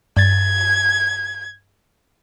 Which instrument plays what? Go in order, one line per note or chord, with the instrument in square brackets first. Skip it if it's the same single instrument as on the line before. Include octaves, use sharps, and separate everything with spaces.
[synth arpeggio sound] G2 A6 [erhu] G#6